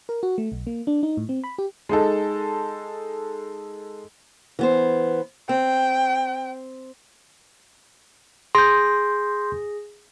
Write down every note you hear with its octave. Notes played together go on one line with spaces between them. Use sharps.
A#4
F#4
A3
B1
A#3
D4
D#4
A2
C4
B5
G4
G#3 D#4 A4
E3 B3 C5
C4 G5
G#4 C6 G6 A#6